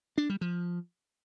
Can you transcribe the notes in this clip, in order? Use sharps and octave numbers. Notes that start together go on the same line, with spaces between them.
D4
G3
F3